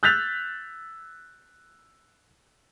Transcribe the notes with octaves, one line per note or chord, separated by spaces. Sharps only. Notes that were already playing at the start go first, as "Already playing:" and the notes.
E6 F#6 G6 A6 B6 F7